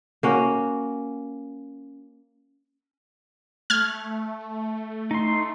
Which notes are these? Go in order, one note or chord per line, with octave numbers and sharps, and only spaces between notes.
A#3 C#4 F#4
A3 F6 G#6
D#4 C6